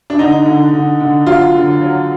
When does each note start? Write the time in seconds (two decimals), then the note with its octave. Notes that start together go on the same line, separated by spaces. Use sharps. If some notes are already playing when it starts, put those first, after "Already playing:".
0.10 D4
0.19 D3 D#4
0.45 D3
0.73 D3
1.00 D3
1.26 F#3 F4
1.55 D3
1.81 F#3